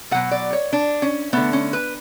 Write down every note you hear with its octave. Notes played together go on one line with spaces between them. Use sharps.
B2 F#3 A3 F#5
D5
C#5
D4
C#4
D3 A3 B3
C#4
B4